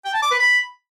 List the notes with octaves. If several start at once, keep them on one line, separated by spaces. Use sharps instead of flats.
G5
A5
D6
B4
B5